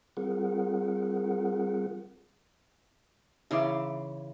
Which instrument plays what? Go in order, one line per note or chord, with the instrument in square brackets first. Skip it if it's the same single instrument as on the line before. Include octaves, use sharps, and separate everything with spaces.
[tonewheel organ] G3 C4 F4 G#4 A#4 F#5
[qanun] C#3 E3 C6 [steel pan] D#4 E4 D6